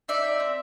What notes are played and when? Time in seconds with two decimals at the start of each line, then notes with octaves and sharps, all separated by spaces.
0.08 D#4 D5 E5
0.24 C4
0.40 C4